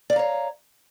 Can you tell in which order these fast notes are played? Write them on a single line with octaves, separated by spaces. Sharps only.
D5 F5 A#5 C#5